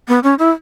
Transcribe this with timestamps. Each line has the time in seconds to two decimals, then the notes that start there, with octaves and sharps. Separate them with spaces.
0.08 B3
0.23 C#4
0.39 E4